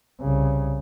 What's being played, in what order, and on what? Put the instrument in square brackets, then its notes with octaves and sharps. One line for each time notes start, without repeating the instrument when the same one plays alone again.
[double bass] C2 C#3